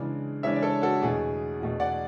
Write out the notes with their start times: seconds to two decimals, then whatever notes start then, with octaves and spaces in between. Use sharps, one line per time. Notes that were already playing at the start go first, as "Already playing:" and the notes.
Already playing: C#3 E3 G#3 D4
0.43 C#3 E3 G#3 D4 C#5 E5
0.56 D5
0.62 A4 C#5
0.82 F#4 A4
1.01 E2 B2 A3 G#4
1.60 E2 B2 A3
1.80 D5 F#5